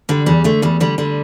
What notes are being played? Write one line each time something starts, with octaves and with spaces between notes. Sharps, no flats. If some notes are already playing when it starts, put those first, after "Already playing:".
D3 G3
E2 G3
D3 A3
E2 G3
D3 G3
D3 G3